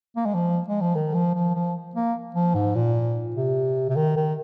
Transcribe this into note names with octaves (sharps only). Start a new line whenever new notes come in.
A#3
G#3
F3
G#3
F3
D#3
F3
F3
F3
A#3
F3
G#2
A#2
C3
C3
D#3
D#3